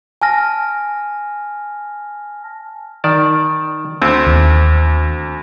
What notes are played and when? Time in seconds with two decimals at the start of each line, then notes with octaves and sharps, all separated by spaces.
0.22 G#5 A5 F6 A#6
3.04 D#3 D5 A5
4.02 D2 C4
4.26 D#2